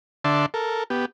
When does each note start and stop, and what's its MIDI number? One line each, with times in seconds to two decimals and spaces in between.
0.24 0.46 50
0.24 0.46 74
0.24 0.46 76
0.24 0.46 81
0.24 0.46 84
0.54 0.84 69
0.54 0.84 70
0.90 1.05 59
0.90 1.05 67